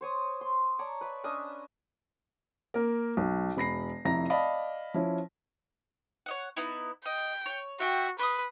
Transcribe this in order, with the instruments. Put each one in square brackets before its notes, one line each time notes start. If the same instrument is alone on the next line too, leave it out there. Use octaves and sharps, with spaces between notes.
[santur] C5 C#5 D#6
C6
C#5 D5 A5 A#5
B4 E5
C#4 D4 D#5 E5
[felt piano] A#3 A#4
B1
E1 B5 A#6 C7
F1 F2 E4 A#5 A#6
D5 D#5 F5 A5 B5
F3 C#4 E4
[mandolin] C#5 D#5 F#5
B3 D#4 E4
[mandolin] D#5 [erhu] G5
[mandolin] C#5
[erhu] F#4 [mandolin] E5 G5
[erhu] B4 [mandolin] C6 C#6 D#6